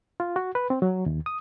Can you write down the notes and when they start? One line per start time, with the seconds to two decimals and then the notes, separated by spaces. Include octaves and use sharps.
0.20 F4
0.36 F#4
0.55 B4
0.70 C4
0.82 F#3
1.06 D#2
1.26 D#6